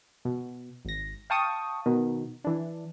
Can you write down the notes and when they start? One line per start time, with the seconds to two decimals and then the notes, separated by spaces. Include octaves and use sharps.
0.25 B2
0.85 G#1 A#6
1.30 F5 G5 A5 C#6 D#6
1.86 B2 D#3
2.44 E3 D4